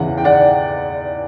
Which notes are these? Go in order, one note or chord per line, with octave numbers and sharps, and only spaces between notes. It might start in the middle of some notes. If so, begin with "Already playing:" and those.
Already playing: E2 C#3 E3 F#5
G5
D5 F#5